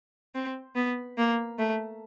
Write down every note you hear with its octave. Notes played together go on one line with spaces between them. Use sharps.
C4
B3
A#3
A3